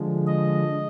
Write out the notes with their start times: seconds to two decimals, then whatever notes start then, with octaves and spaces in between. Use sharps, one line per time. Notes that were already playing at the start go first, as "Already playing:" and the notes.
Already playing: D3 F3 G#3
0.27 D#5